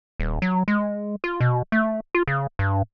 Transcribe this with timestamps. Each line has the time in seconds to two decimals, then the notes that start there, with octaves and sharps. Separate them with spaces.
0.20 D#1
0.42 F#3
0.68 G#3
1.24 F4
1.40 B2
1.72 A3
2.15 F4
2.27 C#3
2.59 G2